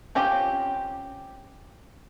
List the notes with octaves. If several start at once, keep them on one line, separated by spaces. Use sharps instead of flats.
C4 C#4 F4 G4